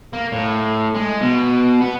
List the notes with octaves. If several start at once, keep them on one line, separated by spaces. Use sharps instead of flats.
A#3
A2
G#3
B2
B3